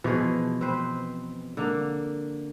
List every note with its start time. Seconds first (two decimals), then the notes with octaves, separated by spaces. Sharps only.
0.04 B2 E3 F3 G#4
0.61 C4 B4 C5
1.57 D3 A#3